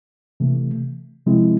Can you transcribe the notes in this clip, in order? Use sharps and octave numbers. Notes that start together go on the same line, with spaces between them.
C3 E3 A3
C3 F3 G#3 C4 E4